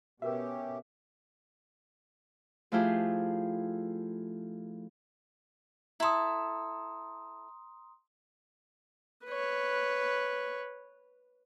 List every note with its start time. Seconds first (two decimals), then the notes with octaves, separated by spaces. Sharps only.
0.22 B2 C#4 F#4 G4 A#4 B4 E5
2.72 F3 A3 E4 F4 G4 G#4
6.00 E4 A4 A#5 C6 D#6
9.26 B4 C#5